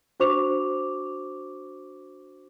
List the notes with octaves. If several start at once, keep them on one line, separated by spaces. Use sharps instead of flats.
D4 F#4 C5 C#6 D6 F7